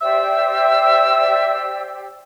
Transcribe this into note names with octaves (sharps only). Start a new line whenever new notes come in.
G4 C5 D5 E5 E6